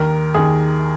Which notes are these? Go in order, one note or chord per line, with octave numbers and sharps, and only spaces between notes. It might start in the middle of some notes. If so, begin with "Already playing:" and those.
Already playing: D#2 D#3 A#4
D#2 D#3 G#4